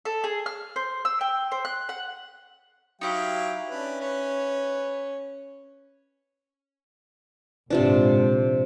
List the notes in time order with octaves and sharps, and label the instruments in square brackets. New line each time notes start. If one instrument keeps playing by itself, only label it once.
[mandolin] A4
G#4
F6
C5
E6
G5
C5
F#6
F#5
[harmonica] F#3 F5 G5 [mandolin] D#4 E4 G4
[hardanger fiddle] C#4 [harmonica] D4 B4
[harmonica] B4 [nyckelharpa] C#5
[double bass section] A#1 G#2 [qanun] C3 F3 D4